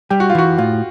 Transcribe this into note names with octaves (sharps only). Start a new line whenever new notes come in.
G3 G4
F#4
F4
E3 F#4
A2 F4